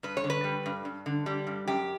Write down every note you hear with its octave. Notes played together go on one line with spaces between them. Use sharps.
G2 B4
C#5
D3
B4
G3
G2
G2
D3
G3
G2
F#2 G4